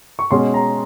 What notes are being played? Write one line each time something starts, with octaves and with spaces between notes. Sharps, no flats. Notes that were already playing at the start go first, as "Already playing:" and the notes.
C#6
B2 G#3 C#4 C6
A#5